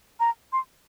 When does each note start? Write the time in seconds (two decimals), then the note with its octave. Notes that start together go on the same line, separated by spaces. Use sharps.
0.20 A#5
0.53 C6